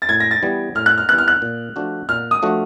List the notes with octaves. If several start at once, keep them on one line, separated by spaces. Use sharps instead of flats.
A6
A2 G#6
A#6
A6
E3 G3 B3
A2 F6
F#6
F6
E3 G3 B3 F#6
F6
F#6
A#2
F3 A3 D4 F#4
A#2 F6
D#6
F3 A3 D4 F#4